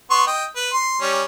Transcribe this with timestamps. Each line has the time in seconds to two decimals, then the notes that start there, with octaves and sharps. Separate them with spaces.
0.11 B3 C6 C#6
0.27 D#5 G5
0.56 B4
0.73 C6
1.01 G3 C#4